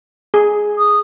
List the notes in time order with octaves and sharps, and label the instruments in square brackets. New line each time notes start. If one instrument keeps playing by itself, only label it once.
[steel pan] G#4
[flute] D#6